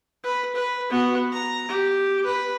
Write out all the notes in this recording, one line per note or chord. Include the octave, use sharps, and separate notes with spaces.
B4
B4
B3 F#4
A#5
G4
B4